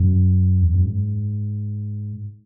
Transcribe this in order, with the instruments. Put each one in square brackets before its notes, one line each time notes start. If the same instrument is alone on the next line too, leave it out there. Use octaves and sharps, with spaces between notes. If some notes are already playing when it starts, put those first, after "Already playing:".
Already playing: [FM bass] F#2
E2
F#2
G#2